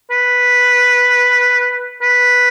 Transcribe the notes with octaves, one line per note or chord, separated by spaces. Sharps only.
B4
B4